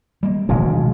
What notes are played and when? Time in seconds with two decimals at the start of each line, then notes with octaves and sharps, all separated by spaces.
0.23 G3 A#3
0.49 G#1 D2 B2 F3 G#3